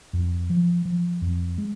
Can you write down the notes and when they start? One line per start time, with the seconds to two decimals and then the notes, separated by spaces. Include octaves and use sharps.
0.13 F2
0.50 F3
0.85 F3
1.22 F2
1.58 G#3